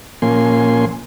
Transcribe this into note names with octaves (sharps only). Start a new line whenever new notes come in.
A#2 F3 A#3 C#4 G#5 C6